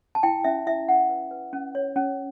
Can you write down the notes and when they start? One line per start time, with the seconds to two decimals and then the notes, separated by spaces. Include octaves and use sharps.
0.15 A5
0.23 E4 G5
0.44 C#4 E5
0.67 E4 E5
0.88 C#4 F#5
1.09 B4
1.31 B4
1.53 C#4
1.75 C#5
1.96 C#4